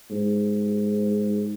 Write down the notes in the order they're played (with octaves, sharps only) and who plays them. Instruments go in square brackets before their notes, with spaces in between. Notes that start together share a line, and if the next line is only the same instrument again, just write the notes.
[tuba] G#2